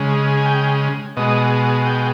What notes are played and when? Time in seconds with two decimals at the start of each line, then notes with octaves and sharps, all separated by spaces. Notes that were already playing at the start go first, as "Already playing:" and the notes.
Already playing: C#3 G#3
0.37 G#5
0.46 G5
1.17 B2 G#3 D#5
1.86 G5